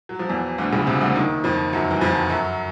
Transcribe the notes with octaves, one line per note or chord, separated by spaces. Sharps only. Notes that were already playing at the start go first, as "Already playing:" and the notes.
F#3
F3
E2 E3
D2 D3
C#2 C#3
C2 C3
D2 D3
D#2 D#3
F2 F3
F#2 F#3
E3
F2 F3
F#2 F#3